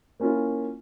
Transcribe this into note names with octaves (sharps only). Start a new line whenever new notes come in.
A#3 C#4 E4 F4